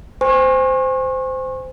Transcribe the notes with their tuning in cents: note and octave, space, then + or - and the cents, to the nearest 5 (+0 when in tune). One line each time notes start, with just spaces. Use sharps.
C5 -15 G#5 -25 C#6 -35